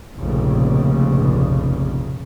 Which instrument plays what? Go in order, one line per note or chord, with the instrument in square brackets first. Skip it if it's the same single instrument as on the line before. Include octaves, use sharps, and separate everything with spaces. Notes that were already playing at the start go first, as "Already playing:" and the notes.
[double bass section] F1 A#1 D#2 C#3